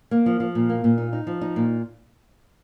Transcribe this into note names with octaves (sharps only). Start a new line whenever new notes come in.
A#3
F3
F3
A#2
A#3
A#2
D#4
D#4
F3
D#4
A#2